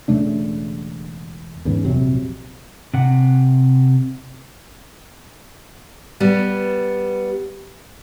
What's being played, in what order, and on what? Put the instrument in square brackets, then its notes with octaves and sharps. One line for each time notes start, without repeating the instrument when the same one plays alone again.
[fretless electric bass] E1 C#3 A3 D4
E2 G#2 C#3
A#1 F2 C3 F#3
[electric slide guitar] C3 F#5
[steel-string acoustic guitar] G3 B3